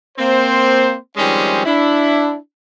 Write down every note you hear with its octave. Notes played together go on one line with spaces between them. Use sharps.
A#3 C4 C5
D#3 F3 G3 G#3 C4 C#4
D4 E4